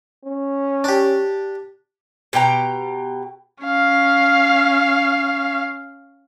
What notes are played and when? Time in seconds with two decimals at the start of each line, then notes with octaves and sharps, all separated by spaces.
0.25 C#4
0.84 D4 G4
2.33 B2 G4 G5 A#5
3.64 C#4 F5